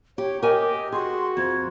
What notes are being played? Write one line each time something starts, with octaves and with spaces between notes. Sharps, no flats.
G4 C#5
G4 A#4 D#5 G#5
F#4 G#4 C6
F2 G#6